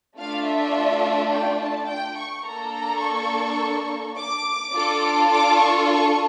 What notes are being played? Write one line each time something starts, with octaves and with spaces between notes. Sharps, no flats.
A3 D4 F4 F5
E5
G5
A5
G5
C#6
A#3 D4 A4 A#5
A#5
C#6
D6
D4 F4 A4
D6
C#6
C#6